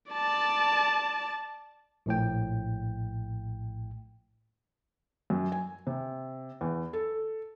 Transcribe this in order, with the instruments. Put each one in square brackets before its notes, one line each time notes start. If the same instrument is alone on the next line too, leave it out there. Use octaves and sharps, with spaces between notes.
[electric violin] D5 A5
[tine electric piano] A#1 A2 G5
[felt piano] F#2
G#5
C3
E2
A4